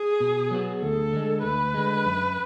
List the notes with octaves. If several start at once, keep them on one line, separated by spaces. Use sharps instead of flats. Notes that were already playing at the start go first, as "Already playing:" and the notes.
Already playing: G#4
B2
F#3 B3 F#4
D2 A4
D3 G#3
D2 B4
D3 G#3
F#2